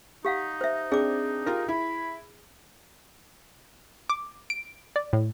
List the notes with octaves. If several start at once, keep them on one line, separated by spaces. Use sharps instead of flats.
D#4 G4 F5 F#5
C5 E5
C4 D4 G#4 D6
F4 G4 A#4
E4 B5
D6
D7
D5
A2